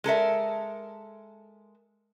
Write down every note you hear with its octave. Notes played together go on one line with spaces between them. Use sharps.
G#3 A4 A#4 E5